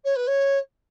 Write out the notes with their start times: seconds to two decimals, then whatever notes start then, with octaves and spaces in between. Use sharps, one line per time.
0.04 C#5
0.15 B4
0.27 C#5